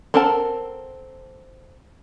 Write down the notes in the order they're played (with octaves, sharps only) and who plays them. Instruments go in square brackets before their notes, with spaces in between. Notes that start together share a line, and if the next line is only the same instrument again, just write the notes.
[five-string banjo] C4 A4 A#4 F#5 A5